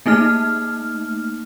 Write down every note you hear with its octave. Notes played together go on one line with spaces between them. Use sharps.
A3 A#3 D#4 F6